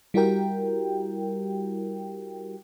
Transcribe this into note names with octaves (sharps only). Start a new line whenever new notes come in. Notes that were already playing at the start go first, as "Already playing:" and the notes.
G3 E4 F#4 G4 A#4 G5